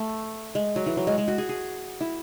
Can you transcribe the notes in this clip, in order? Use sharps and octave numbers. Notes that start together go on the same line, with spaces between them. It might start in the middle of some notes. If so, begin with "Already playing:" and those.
Already playing: A3
G#3
F#3
E3
F#3
G#3
G#3
F#4
G#4
G#4
E4